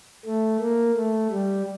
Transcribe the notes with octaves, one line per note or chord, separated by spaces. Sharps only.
A3
A#3
A3
G3